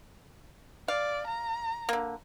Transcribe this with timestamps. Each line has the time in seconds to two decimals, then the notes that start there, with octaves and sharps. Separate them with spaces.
0.88 D5 F5
1.27 A#5
1.89 D3 A#3